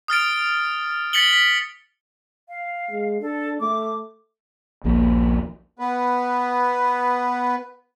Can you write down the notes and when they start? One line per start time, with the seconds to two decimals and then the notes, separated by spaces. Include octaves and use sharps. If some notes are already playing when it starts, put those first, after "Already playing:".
0.08 D#6 F6 A6 D7
1.13 A6 B6 C#7 F#7 G7
1.33 B6
2.49 F5
2.90 G#3
3.21 D4 A4
3.60 A3 D6
4.84 D#1 A#1 F3 A#3
5.79 B3 B4